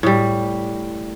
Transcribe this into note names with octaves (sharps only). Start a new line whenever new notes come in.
A2 G3